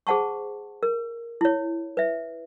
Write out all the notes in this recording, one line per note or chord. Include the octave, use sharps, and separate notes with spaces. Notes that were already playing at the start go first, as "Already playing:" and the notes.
G#4 C5 F#5 A5 C#6
A#4
E4 C#5
B4 E5